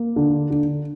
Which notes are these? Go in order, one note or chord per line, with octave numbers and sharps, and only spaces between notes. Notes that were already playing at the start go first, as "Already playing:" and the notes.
Already playing: A#3
D3
D3